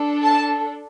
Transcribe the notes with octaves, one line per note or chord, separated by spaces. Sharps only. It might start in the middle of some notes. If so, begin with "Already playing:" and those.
Already playing: D4 A4
A5